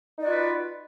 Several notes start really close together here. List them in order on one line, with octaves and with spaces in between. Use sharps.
D#4 D5 F#4 F4 B4